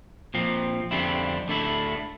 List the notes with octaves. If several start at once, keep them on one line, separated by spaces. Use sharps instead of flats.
A#2 F3 C4
F2 D3 G3 C4 E4
D2 D3 A3 E4